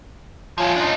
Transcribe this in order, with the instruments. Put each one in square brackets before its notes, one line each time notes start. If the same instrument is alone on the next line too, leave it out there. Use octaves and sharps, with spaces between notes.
[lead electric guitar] F3 G#4 [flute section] F4 C#5
[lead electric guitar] D4 D#4